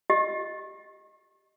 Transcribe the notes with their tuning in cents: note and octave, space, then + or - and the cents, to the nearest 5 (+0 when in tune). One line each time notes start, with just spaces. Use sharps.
G4 -15 D#5 +0